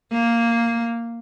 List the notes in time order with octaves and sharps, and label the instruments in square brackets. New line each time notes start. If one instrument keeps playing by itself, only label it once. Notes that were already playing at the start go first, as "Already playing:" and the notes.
[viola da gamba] A#3